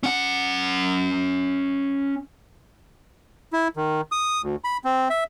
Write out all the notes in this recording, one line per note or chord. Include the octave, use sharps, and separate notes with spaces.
C#4 F#5
E4
D#3
D#6
D2
B5
C4
E5